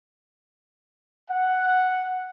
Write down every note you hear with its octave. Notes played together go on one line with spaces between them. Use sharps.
F#5